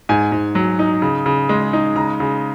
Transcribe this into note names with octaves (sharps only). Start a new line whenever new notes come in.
G#2 G#5
G#2
F#3
D#4
C#3
C#3
G#3
D#4
C#3 A#5
C#3